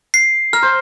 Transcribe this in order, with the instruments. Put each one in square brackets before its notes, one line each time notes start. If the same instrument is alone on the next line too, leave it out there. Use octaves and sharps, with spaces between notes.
[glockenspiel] C7
[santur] A#4 [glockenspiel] F6
[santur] C5